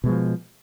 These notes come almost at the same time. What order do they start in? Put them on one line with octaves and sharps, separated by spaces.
B2 G#3 F3